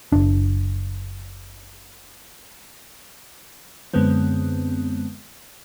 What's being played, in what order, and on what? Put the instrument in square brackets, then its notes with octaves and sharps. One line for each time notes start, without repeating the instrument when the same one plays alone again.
[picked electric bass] F#1 D4
[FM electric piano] F#2 D3 G#3 B3 C4